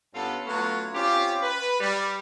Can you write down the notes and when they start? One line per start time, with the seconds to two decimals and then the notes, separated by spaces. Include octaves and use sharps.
0.13 G2 B3 C#4 F4 A4
0.46 F#3 A3 B3 C#4 F4 F#4
0.93 C4 C#4 F4 G4
1.42 B4
1.80 G3